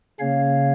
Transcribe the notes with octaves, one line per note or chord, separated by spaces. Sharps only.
C#3 A#3 C#4 C#5 F5